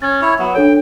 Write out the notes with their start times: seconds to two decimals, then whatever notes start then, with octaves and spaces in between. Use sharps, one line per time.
0.02 C#4 G#6 A6
0.21 E4 C#5
0.39 F#3 B3
0.55 D4 A4 C#5 G5